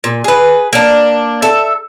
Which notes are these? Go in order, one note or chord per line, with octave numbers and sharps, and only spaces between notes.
A#2
G#4 B4
A#3 D4
A4 E5